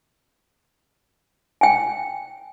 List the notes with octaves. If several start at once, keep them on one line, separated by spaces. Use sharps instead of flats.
G5 G#5